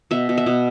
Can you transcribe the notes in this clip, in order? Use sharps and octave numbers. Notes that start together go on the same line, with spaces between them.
B2 E5
B2
E5
B2